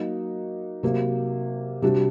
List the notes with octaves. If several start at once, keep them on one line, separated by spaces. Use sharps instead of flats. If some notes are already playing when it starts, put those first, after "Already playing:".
Already playing: F#3 A#3 D#4 F#4
C3 F#3 A#3
C3 G3 D4 F#4